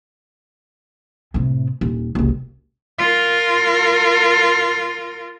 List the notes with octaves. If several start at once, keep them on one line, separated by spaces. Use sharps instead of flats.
A2 C3
D#1
F#1 C2
F4 A#4